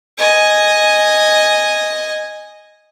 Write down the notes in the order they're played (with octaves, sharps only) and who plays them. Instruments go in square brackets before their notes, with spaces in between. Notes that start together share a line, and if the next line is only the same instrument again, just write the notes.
[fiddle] D#5 G#5